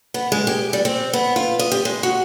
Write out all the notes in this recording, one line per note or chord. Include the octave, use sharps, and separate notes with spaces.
B3
G#3
G4
G3
C4
B3
F4
D#5
G4
G#3
F#4